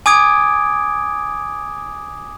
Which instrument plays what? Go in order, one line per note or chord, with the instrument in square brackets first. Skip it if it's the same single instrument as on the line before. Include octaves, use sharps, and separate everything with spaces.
[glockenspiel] G#5 D6 D#6 G#6 D7